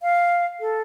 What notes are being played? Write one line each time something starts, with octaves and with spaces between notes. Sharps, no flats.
F5
A4